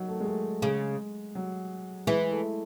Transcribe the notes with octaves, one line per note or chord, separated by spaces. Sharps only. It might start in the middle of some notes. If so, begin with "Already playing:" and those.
Already playing: D#3 F#3
A3
G#3
A3
C#3 G#3
F#3
E3 G#3
A3